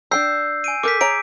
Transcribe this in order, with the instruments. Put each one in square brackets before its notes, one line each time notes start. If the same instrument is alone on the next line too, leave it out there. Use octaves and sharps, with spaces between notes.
[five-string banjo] D4 G5 A#5 [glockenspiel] E6 G6 C7
[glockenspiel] G#5 D7 D#7
[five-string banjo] A4 A#4 [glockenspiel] D6 G6 B6
[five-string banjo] G#4 C#5 A#5 [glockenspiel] D7